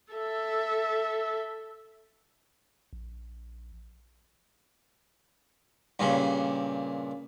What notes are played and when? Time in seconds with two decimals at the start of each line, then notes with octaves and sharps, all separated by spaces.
0.13 A4 E5
2.93 A#1
5.99 G2 A#2 C#3